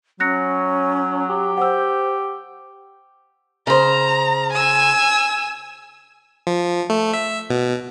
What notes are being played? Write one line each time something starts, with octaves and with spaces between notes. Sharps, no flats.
F#3 C#4 F#6 A#6 C#7
G4
C5 F#5 E6
C#3 C5 A#5
G#5 E6
F3
A3
E5
B2